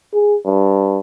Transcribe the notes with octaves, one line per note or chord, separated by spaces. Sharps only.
G#4
G2